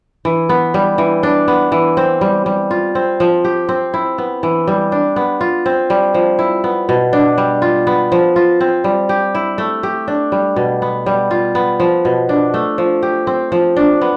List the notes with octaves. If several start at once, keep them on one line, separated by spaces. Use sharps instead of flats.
E3
B3
G3
E3
D4
B3
E3
C4
G3
G3
F4
C4
F3
G4
C4
E4
B3
E3
G3
D4
B3
F4
C4
G3
F3
E4
B3
B2
D4
G3
F4
B3
F3
F4
C4
G3
G4
E4
A3
G4
D4
G3
B2
B3
G3
F4
B3
F3
B2
D4
A3
F3
G4
C4
F3
D4
B3